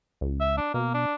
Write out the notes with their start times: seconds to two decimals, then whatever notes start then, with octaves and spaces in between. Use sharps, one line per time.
0.21 C#2
0.41 E5
0.57 D4
0.74 B2 A#3
0.94 D4